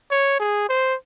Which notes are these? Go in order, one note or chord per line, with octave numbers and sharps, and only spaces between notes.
C#5
G#4
C5